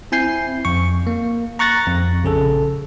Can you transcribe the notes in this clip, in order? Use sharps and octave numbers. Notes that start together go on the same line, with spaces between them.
C4 E4 G#5 G6 C7
F2 C#6
A#3
A#5 C#6 F#6 A6 A#6
F2
A#1 C#3 G#4 A4